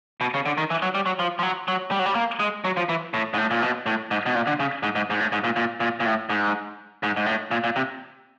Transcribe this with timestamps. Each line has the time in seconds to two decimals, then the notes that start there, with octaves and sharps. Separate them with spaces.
0.21 B2
0.34 C#3
0.46 D3
0.58 D#3
0.70 E3
0.82 F#3
0.95 G3
1.06 F#3
1.19 F3
1.39 F3
1.43 F#3
1.68 F#3
1.91 G3
1.99 F#3
2.06 G3
2.15 A#3
2.40 G#3
2.65 F#3
2.77 F3
2.89 E3
3.14 A2
3.34 G#2
3.38 A2
3.51 A#2
3.62 B2
3.86 A2
4.11 G#2
4.26 B2
4.35 A#2
4.47 D3
4.60 C#3
4.83 G#2
4.95 G#2
5.10 G#2
5.20 A2
5.32 G#2
5.44 A#2
5.56 A#2
5.80 A#2
6.00 A#2
6.06 A2
6.30 G#2
7.03 G#2
7.17 G#2
7.26 A2
7.51 A#2
7.64 A#2
7.76 C3